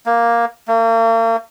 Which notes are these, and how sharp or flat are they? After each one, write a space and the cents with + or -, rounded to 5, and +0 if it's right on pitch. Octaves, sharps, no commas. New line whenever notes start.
A#3 +5
A#3 -40